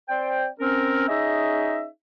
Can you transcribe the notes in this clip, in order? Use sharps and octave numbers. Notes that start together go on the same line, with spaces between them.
C4 C5 D5 G5
C4 C#4 A#4
C#4 D#4 G#4 D#5 E5